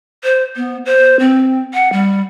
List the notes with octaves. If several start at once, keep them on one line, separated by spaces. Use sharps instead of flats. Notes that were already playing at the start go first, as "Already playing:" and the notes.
C5
B3
C5
C4
F#5
G3